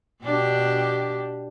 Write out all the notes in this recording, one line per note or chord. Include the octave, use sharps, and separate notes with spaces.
B2 D4 G4